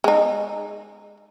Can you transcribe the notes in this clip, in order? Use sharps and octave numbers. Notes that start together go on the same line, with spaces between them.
G#3 D#4